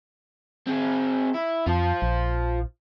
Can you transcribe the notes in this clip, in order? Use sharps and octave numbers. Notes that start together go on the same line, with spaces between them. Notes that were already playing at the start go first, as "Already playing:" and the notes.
C4 G#4
E4
F2 F4 C5
A#1